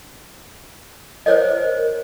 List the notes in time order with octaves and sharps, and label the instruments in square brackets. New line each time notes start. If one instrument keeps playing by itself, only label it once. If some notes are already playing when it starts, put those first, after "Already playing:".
[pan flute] A#4 [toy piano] C5 C#5 D#5